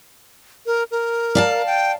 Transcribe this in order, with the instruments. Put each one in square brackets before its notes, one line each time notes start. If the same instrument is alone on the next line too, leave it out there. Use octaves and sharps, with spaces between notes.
[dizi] A#4
A#4
[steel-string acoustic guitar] D5 F5 A5
[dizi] G5